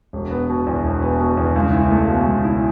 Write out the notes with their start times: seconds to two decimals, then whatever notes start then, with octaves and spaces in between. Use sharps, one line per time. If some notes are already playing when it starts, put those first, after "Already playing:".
0.13 E1
0.31 B3
0.49 B2
0.67 E2
0.85 E1
1.02 B3
1.20 B2
1.37 E2
1.56 C#2
1.73 E4
1.91 A3
2.08 B2
2.26 C#2
2.44 E4